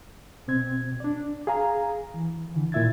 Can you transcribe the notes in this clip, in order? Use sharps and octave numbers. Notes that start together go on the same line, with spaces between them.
B2 C4 G#6
D4 D5
G#4 F5 G#5 A#5
E3
D3 E3
A#2 E4 E5 G#6 A6